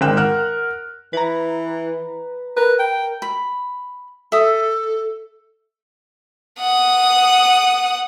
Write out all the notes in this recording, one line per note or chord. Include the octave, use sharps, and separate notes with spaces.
G#1 G#3 A#4 G5 F#6 E7
A#4 F#5 F6 F#6
E3 B4 A#5
A#4 B4 A#5
G5
B5
A4 E5 D#6
F#5 D#6